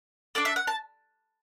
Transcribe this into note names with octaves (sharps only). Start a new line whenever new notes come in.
D4 A4 D5
E5
F#5
A5